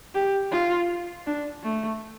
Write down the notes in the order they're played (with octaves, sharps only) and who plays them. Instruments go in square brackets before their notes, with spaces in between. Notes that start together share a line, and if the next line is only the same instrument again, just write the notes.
[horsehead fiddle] G4
F4
D4
A3